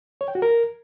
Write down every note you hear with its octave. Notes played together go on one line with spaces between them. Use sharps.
C#5
G5
F#4
A#4